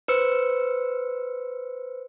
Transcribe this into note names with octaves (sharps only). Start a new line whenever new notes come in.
B4 C5 E6 C#7